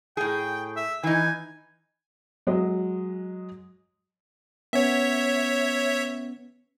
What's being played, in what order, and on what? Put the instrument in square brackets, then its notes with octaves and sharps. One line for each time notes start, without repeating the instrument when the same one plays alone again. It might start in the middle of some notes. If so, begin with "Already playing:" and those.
[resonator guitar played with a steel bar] A2 G#4 [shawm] G5
[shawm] E5
[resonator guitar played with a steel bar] E3 D#4 [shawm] G#5
[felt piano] F#3 G#3 D#5
[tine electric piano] B3 C#4 [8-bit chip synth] C#5 E5